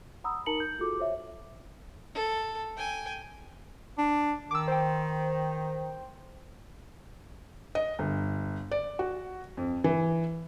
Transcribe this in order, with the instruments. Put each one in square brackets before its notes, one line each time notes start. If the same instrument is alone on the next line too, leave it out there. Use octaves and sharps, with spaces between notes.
[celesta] F#5 A#5 B5 D#6 E6
D#4 A#4 A5 A#5 C#7 F#7
G6
F4 F#4 G#4 A4 D6
C5 C#5 E5
[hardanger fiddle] A4
G5 G#5
[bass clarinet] D4
[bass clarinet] D#3 [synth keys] D6 E6
[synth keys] C5 G5
[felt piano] D#5
G1
D5
F#4
F2
E3